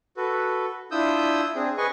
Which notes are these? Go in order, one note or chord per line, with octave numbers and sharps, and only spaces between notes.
F#4 A4 B4
D4 E4 F4 D#6 E6 G6
C4 D4 G#4
G#4 B4 D#5 G#5 C#6